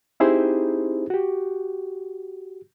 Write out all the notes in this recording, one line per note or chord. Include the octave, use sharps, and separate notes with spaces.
C4 D#4 E4 G4 G#4 C5
F#4 G4